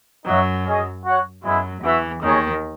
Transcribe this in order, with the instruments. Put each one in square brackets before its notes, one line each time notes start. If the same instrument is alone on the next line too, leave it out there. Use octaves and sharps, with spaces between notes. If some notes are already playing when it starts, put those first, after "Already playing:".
[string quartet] F#2 F#3 [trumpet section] D#4 F#4 C#5 E5
[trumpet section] C#4 G#4 D#5
F#4 C#5 F#5
[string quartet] F#2 F#3 [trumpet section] G#3 B3 E4
[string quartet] E2 E3 [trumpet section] F#4 B4 E5
[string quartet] D#2 D#3 [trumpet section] D#4 G#4 C#5